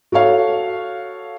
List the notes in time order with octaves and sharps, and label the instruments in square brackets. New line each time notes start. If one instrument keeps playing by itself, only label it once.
[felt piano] F#4 A4 C#5 F5